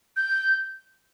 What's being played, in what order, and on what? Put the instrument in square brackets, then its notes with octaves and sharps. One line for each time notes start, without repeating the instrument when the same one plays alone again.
[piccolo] G6